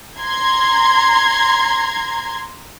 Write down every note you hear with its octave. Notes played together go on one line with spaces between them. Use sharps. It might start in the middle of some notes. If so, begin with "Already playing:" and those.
A#5 C6 G#6